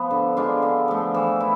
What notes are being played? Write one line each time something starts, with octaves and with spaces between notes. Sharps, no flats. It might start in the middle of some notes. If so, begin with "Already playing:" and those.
Already playing: F3 B3
D3
G#3 D4 F4
D3
F3 A3
E3
E4